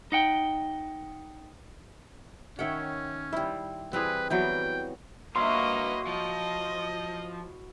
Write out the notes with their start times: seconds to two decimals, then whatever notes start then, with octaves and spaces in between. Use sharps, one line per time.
0.12 D#4 F#5 G5
2.59 D#3 C#4 C#5 E5 F#5 G5
3.33 G3 E4 C5
3.93 E3 G3 C4 G#4 B4
4.31 E3 F#3 G3 B3 G5
5.36 F#3 A#3 E4 B4 D#5 F5 C6
6.07 F3 D#5